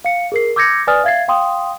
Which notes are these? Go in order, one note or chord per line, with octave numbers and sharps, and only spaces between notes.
F5 C#7
G#4 A#4 C7
D6 E6 G6 G#6 A#6 C#7
B4 D5 G#5 D#6 F6 A6
E5 F5 G#6 A6 C7
F5 G5 C6 D#6